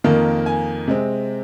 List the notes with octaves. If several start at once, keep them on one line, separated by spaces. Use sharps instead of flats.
F2 D#3 A#3 A#4
G#5
C3 G#3 C4